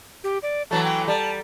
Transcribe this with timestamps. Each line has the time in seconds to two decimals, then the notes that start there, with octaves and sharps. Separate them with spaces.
0.24 G4
0.43 D5
0.71 E3 F#3 A3 A5
0.84 G5
1.08 G3 A5